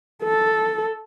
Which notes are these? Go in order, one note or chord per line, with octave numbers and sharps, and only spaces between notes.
A4